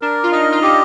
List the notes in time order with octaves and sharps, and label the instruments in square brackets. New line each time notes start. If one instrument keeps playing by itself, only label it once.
[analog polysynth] D4 [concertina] A#4
[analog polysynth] F4
[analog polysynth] D#4 [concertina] D#5
[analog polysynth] F4
[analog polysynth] D#4 [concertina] G4